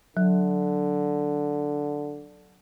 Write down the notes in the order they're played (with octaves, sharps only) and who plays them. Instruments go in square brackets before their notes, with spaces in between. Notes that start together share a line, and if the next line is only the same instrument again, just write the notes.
[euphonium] D3 [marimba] F#3